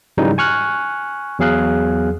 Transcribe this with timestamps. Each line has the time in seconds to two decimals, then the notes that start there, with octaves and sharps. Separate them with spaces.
0.18 G#2 C#3 E3 F#3 G3 D#4
0.38 G#5 C#6 F6 F#6
1.39 E2 F#3 G#4 F5 F#6